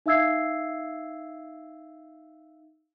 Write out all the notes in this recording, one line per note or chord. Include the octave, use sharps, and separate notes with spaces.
D#4 E5 F5 E6 G#6 C7